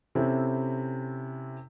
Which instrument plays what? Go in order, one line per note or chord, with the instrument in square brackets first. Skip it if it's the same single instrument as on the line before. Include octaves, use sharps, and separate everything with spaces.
[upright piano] C3 C4 C#4 E4 A4